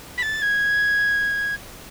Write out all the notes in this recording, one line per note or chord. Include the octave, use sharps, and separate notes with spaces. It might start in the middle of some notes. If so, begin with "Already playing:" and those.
B6
A6
G#6